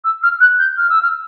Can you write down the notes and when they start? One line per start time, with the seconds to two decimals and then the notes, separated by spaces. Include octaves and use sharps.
0.04 E6
0.23 F6
0.40 F#6
0.59 G6
0.77 F6
0.90 E6
1.02 F6